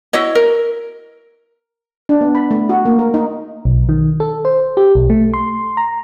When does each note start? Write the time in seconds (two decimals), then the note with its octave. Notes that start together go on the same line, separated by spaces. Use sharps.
0.13 E4 F#4 C#5 D#5
0.35 A#4
2.09 D4
2.21 B3
2.35 B5
2.51 A3
2.69 F#4
2.85 A#3
2.99 A#4
3.14 D#4
3.65 B1
3.89 D#3
4.20 A4
4.45 C5
4.77 G4
4.95 B1
5.10 A3
5.34 C6
5.77 A#5